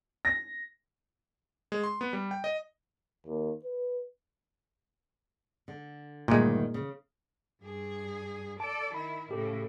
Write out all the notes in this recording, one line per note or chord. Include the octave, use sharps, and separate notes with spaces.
A#6
G#3
C6
B3
G3
G5
D#5
D#2
B4
D3
D2 G2 A#2 D#3 G#3
C#3
G2 G#4
A4 D5 A5
D#3 E4 B5
A2 C#3 G4 A4